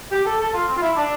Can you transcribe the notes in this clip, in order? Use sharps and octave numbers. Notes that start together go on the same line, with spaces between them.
G4
A4
A4
F4
C4
F4
E4
D4